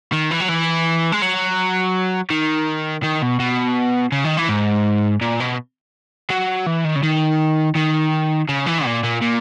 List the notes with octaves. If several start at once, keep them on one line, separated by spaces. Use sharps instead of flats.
D#3
E3
F#3
E3
G#3
F#3
D#3
D#3
B2
B2
C#3
D#3
E3
G#2
A#2
B2
F#3
E3
D#3
C#3
D#3
D#3
C#3
E3
A#2
A#2
A#2